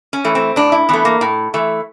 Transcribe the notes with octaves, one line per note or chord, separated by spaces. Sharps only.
C#4
E3 A3
C4
A2 D4
E4
E3 A3 B3
A#3
A2
E3 A3